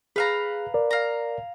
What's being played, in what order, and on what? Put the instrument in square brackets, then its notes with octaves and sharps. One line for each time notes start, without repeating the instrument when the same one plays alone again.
[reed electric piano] G#4 [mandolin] B4 F5 A#5
[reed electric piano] A#4 D5
[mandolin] F5 A#5